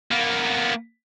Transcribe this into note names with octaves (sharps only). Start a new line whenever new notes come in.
A#3 B3